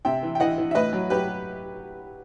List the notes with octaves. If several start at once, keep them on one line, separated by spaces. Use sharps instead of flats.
C3 E5 G5
E3
G5
E3 D#5 F#5
E3
E5
A2 B4 D#5
F#3
F#3 G4 B4